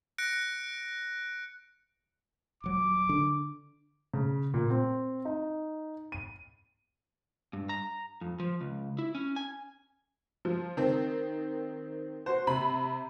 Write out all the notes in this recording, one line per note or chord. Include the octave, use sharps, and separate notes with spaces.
F#6 A#6 C#7 D7
D#1 F#3 D6
D3 D4
C#3
A#2
C4
D#4
D#7
G2
A#5
F2
F3
C#2
E4
C#4
G#5
F3
D#3 C4
F#4 C5
C3 B5